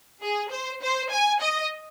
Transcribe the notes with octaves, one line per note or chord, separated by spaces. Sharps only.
G#4
C5
C5
G#5
D#5